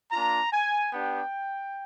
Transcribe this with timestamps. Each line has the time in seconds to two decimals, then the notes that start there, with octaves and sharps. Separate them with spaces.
0.12 A#3 D4 F4 A#5
0.53 G#5
0.93 B3 D4 G4 G5